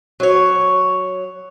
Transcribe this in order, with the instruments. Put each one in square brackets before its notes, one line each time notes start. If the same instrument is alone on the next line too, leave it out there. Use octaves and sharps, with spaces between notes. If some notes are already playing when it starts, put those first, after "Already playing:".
[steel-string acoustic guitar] F#3 C#5